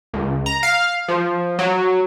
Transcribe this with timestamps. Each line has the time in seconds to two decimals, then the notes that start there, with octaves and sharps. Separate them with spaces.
0.14 C#2
0.46 A#5
0.63 F5
1.08 F3
1.59 F#3